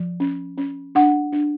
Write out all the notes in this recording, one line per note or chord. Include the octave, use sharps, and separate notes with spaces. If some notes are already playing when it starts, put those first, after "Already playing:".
Already playing: F3
C#4
C#4
D4 F#5
D4